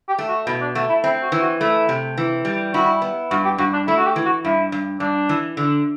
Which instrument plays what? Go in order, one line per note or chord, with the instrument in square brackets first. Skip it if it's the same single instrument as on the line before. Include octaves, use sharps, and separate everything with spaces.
[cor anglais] G4
[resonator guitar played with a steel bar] A3
[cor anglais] F#4
[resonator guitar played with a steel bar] B2 [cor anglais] E4
[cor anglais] D4
[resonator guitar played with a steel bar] A3 [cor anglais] F#4
[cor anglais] E4
[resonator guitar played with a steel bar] C4 [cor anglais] E4
[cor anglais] F#4
[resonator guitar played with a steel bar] E3
[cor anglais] F#4
[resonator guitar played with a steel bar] A3 [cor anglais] E4
[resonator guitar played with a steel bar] C3
E3
G3
[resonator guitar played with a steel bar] E4 [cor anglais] F#4
[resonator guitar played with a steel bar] B3
[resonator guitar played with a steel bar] G2 [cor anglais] F#4
[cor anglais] G4
[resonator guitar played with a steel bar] G2 [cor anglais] F#4
[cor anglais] D4
[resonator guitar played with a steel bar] A3 [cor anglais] E4
[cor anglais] F#4
G4
[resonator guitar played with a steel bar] E3
[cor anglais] F#4
[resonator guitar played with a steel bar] G2 [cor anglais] E4
[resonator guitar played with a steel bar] G2
[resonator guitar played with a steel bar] G2 [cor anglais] D4
[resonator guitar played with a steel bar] E3
D3